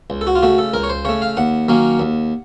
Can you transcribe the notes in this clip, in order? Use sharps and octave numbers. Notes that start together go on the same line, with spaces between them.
C#2
A4
F#4
F4
C#3 A3 F#4
A4
C#2 A#4
C#5
C5
C#3 A3 C#5
F5
D#2 F#5
D#3 F#3 A#3 C#4
D#2